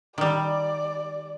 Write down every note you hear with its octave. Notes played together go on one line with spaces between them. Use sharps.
D#3 G3 D5